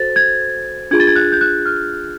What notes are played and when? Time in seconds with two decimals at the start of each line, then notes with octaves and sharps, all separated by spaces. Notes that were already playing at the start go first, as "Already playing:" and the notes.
Already playing: F#4 A4 C5 A6
0.16 G#6
0.91 D4 F4 G#4 G#6
1.00 A6
1.07 G#6
1.16 F#6
1.32 G6
1.41 F#6
1.66 F6